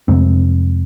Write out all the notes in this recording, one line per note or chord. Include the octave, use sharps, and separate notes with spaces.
F2 C3 G#3 C4